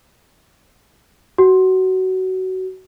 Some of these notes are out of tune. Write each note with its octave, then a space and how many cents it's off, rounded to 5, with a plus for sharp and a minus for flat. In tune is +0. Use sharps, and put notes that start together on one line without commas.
F#4 +20